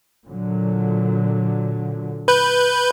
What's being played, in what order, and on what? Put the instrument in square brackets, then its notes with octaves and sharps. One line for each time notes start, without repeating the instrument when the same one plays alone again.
[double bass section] A#2 D3 F#3
[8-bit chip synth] B4 G6